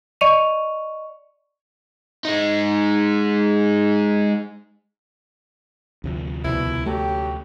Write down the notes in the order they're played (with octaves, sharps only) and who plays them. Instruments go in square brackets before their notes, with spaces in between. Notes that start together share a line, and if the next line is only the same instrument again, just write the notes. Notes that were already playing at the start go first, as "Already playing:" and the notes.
[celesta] D5 D#5 C#6 C#7 D#7 F7
[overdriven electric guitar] G#3 D#4
[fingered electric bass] D2 C3 F3
[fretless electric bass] C2 B2 [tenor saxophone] E4
[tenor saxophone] F#3 [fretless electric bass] A3 [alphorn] G4